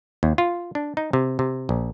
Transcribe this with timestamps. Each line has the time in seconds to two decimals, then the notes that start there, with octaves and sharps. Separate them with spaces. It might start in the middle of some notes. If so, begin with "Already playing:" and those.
0.23 D#2
0.38 F4
0.75 D4
0.97 D#4
1.13 C3
1.39 C3
1.69 A#1